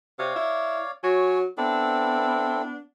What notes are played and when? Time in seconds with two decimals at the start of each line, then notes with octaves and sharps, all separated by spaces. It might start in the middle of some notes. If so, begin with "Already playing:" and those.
0.19 C3 C#5 D5 F5
0.35 E4
1.03 F#3 C#5 G#5
1.58 B3 C4 D4 E4 A4